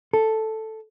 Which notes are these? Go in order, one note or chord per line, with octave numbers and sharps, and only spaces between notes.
A4